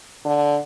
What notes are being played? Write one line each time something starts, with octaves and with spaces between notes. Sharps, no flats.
D3